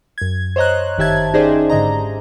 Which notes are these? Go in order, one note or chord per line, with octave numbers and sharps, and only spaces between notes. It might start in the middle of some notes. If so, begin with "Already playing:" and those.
F#2 G#6
C5 C#5 D#5 A#5 F#6
G1 D#3 G4 E5 A5 G#6
C#4 D#4 G4 G#4 C5 D5
G#2 D3 D#5 A#5